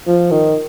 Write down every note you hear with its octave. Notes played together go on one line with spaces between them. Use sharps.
F3
D#3